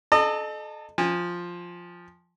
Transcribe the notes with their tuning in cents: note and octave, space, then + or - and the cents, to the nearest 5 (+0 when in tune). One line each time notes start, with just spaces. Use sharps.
A4 -30 D#5 -35 A5 +40
F3 +5 G#5 -30